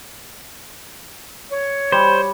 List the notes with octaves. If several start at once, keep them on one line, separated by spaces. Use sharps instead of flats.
C#5
G3 C5